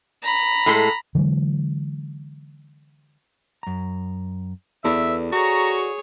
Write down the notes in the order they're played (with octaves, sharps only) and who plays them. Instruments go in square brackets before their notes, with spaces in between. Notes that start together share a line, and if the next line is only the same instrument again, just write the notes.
[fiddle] A#5 B5
[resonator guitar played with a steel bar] A2 G#3 A4
[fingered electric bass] D3 E3 F#3 G#3
[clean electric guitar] F#2 A#5
[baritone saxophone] E2 [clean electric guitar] A4 B4 D5 [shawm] E5
[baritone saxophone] F#4 [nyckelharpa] G#4 C#5 [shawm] A#5